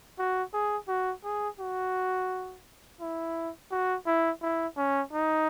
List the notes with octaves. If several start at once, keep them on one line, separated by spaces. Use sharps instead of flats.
F#4
G#4
F#4
G#4
F#4
E4
F#4
E4
E4
C#4
D#4